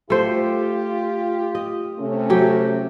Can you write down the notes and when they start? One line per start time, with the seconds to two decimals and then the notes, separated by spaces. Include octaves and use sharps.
0.10 A3 F4 G4 C5
1.55 D#5
1.99 C3 A3 C#4
2.30 F#3 G4